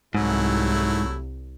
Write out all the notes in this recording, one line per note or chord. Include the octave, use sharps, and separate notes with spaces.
C2 G#2 F#3 A3 E4